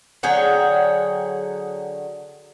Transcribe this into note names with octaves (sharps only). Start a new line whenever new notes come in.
D3 F#3 G#4 G5